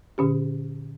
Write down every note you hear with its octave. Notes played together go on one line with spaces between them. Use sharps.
A#2 D3 C#4 G4